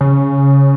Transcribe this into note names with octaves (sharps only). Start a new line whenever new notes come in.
C#3